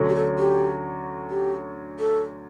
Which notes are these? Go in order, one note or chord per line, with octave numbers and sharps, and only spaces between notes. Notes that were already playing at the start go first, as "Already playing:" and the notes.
Already playing: D2 D3 F#3 C#4
G4
A4
G4
G4
A4